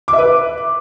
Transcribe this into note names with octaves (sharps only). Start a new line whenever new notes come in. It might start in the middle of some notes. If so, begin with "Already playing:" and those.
D6
E5
B4